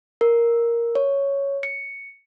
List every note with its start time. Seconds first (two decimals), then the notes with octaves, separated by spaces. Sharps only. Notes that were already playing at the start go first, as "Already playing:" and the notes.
0.21 A#4
0.95 C#5
1.63 C#7